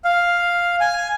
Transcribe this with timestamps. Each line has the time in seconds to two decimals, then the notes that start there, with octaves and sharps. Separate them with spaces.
0.05 F5
0.81 G#5